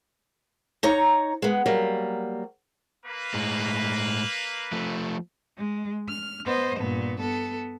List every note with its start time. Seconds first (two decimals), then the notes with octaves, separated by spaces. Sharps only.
0.83 D#4 C#5 A#5
1.42 G#3 B3
1.66 F#3 G3 A#3
3.06 A#3 B4
3.34 A2 G#3
4.72 F3 A3
5.55 G#3
6.08 F6
6.45 B3 C5 D#5
6.78 G2 A#2 B3
7.20 B3 A4